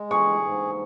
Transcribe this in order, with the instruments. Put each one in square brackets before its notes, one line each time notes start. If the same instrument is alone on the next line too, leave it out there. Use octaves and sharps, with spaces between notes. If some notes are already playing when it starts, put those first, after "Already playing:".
Already playing: [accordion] G#3
[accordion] G#4 [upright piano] C#6
[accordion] G#2